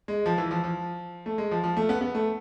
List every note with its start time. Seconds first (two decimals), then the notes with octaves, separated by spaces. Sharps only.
0.08 G#3
0.26 F3
0.38 E3
0.51 F3
0.64 F3
1.26 A3
1.38 G#3
1.51 F3
1.64 F3
1.77 A3
1.89 B3
2.01 B3
2.15 A3